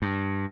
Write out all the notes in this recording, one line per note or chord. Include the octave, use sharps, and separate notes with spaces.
G2